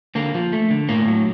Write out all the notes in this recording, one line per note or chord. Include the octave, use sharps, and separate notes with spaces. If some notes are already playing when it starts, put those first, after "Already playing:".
D3 A#3
F3
A3
D3
A2 A#3
F#3